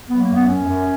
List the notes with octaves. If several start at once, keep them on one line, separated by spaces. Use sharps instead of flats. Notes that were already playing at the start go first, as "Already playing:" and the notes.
F#3 B3
A#3
F#2
B3
F#2 C#4
F#2